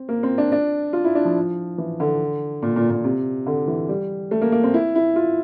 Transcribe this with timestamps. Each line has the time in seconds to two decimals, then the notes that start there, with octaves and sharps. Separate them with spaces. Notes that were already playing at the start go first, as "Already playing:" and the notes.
Already playing: C4
0.09 A#3
0.23 C4
0.38 D4
0.52 D4
0.93 F4
1.04 E4
1.15 D4
1.25 F3
1.78 E3
2.00 D3
2.62 A#2
2.76 A#2
2.90 A#2
3.04 C3
3.46 D3
3.68 E3
3.89 G3
4.31 A3
4.41 A#3
4.52 A#3
4.63 C4
4.74 E4
4.95 E4
5.16 F4